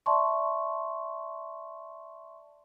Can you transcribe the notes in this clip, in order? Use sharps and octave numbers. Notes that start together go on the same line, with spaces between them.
D5 E5 A5 C6 C#6